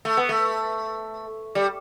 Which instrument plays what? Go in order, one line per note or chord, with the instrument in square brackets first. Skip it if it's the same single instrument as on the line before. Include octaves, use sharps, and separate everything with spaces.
[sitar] A3
B3
A3
G3